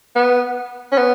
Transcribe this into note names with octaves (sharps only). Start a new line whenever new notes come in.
B3
C#4
B3